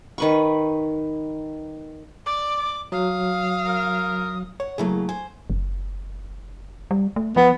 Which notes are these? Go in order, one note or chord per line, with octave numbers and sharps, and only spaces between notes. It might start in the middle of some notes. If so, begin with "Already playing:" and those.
D#3 B4 C#6
D5 D6
F#3 F5 D#6
A#4
C#5 F#5
C#3 F#3 A3 A#3 E4 G#4
C5 G#5
F#1
G3
A3
F3 B3